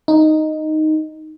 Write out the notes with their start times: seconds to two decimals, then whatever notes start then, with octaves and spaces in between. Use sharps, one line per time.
0.08 D#4